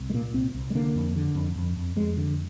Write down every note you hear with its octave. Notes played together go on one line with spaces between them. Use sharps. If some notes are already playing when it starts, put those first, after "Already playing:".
Already playing: C2
G#3
A#2 A#3
C2 C4
C2
G#3
D3 A#3
F2
D3
F2
F2
F2
F2 G#3
D3